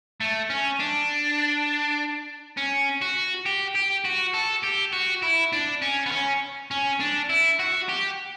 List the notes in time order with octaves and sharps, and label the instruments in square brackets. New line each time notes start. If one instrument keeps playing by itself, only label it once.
[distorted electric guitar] A3
C#4
D4
C#4
F#4
G4
G4
F#4
A4
G4
F#4
E4
D4
C#4
B3
C#4
C#4
D4
E4
F#4
G4